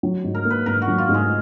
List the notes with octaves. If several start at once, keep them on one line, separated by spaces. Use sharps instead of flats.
F#3
G#2
A#4
A#3
B4
G#2 A#4
F#4
F#3
F4
G#2
G#3